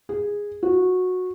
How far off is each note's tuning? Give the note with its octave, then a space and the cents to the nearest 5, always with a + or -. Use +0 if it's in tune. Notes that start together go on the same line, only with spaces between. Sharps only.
G#4 -10
F#4 -15